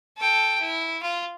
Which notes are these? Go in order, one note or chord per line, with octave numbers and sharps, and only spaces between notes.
A4 G5
E4
F4